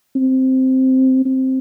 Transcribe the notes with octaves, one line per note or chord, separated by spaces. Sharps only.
C4
C4